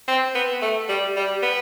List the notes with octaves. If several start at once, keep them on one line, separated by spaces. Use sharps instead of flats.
C4
B3
A3
G3
G3
B3